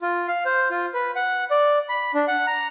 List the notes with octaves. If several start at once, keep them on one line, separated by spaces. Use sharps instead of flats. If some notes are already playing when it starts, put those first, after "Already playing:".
F4
F5
C5
F4
B4
F#5
D5
B5
D4
F#5
A#5